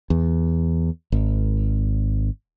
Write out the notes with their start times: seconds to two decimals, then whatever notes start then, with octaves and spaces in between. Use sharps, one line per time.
0.10 E2
1.12 G#1